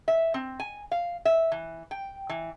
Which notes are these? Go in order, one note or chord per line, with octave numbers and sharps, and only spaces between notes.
E5
C4
G#5
F5
E5
E3
G5
E3